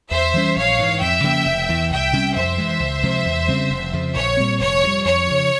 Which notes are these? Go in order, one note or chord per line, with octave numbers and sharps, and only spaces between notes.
E2 C5 E5
E3 G3 C#4
A#1 C#5 F5
G#2 E3
F2 E5 G5
C#3 F3 A#3
F1
E2 E3
C2 E5 G5
C3 G3 C#4
F2 C5 E5
E3 G#3
C#2
C3 F3 G#3
E2
C#3 G3 C4
F1
F2 C#3 F3
A#1 C#5
A#2 G3 C4
F1 C#5
F2 C3 G3
F2 C#5
C#3 F3